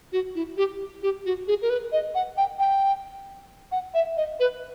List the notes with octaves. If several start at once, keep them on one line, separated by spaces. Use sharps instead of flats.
F#4
E4
G4
G4
F#4
G#4
A#4
B4
D#5
F#5
G5
G5
F#5
E5
D#5
B4